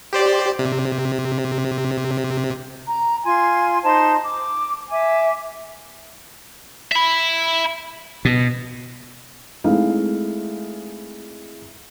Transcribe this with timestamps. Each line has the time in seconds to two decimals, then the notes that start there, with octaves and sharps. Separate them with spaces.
0.13 G4 C5 D5
0.59 C3
2.87 A#5
3.25 F4 G#5 C6
3.84 D#4 C5 A5 C6
4.23 D6
4.90 E5 G#5 D6
6.92 E5 B5
8.25 B2
9.64 G#3 A3 C4 D#4 E4 F5